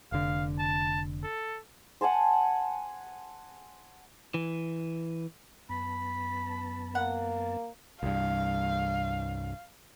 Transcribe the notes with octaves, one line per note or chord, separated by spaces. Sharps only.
F1 D3 F5
A5
A4
F#5 G#5 A5 C6
E3
F#2 B3 A5 B5
A#3 F#5
C2 G2 F5